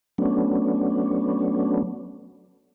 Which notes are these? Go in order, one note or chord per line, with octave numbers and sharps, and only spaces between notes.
F#3 A3 B3 C#4 D4